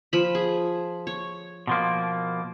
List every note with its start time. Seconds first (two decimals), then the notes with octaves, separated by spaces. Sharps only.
0.13 F3 B5
0.35 G#4
1.07 C#5
1.67 B2 F3 A#3